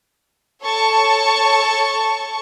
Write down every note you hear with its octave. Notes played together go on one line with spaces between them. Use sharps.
A4 C#5 A5 C#6